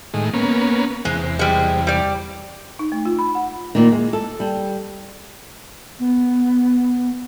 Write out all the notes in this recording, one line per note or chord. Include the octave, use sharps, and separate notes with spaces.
A2 D#3 G#3
A#3 B3 C#4
E2 C3 G#3
G3 G#3
G3 D5
D#4
A3
F4
B5
F#5
A#2 D#3
G#3
A4
G3
B3